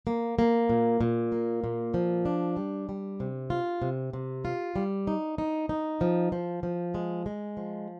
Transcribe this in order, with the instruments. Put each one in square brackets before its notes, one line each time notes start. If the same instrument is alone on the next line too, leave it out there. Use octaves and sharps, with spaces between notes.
[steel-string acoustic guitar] A#3
A#3
A#2
A#2
A#3
A#2
F3
D4
G3
G3
C3
F4
C3
C3
F4
G3
D#4
D#4
D#4
F3
F3
F3
G#3
G#3
F3